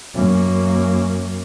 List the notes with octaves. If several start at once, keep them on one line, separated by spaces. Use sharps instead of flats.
F#2 A#3